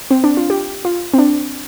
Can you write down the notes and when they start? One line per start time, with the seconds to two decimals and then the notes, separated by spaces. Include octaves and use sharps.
0.11 C4
0.24 D4
0.37 F4
0.50 G4
0.85 F4
1.14 C4
1.18 D4